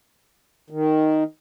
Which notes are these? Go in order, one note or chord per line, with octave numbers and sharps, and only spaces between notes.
D#3